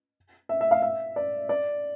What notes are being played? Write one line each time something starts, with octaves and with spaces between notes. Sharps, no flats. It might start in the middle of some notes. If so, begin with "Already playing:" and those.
E5
E5
F5
E5
D5
D5